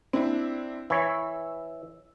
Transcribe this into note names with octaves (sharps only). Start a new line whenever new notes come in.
C4 D4 E4
E3 C#5 E6